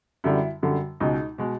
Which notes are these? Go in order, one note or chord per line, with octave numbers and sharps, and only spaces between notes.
F#2 D3 G3 E4
F#2 D3 G3
C#2 B2 G#3 D#4
B2 G#3